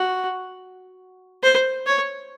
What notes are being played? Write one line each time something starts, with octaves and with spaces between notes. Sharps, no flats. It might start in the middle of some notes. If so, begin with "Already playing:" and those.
Already playing: F#4
C5
C#5